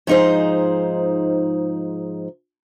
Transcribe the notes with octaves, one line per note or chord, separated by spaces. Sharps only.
G#2 F3 D#4 G#4 C5